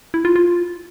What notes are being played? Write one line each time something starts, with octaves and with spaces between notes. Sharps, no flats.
E4
F4
F4